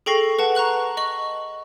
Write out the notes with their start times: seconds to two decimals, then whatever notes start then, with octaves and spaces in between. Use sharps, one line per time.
0.06 G#4 A4 G5 C#6 A#6 C7
0.39 B4 F#5 A5
0.55 A#5 C#6 F#6 F#7
0.97 D#5 C#6 F#7